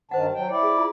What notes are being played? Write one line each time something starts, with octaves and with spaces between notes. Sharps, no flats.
G2 D#3 C5 F#5 A5
F#3 G5
E4 D5 G5
G#4
F4